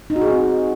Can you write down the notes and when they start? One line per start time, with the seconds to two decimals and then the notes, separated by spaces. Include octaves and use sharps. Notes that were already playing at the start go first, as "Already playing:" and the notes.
0.10 D#4
0.16 F#4
0.22 G#4
0.27 C4